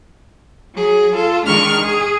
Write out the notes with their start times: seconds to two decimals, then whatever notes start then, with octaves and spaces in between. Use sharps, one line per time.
0.74 F#3 G#4
1.14 F4 A4
1.45 D#3 G#3 D4 C#6 F6
1.81 G#4